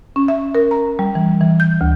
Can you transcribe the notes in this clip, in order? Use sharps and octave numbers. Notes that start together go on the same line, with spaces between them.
C#4
E5
A#4
A#5
G3
E3
E3
G6
D2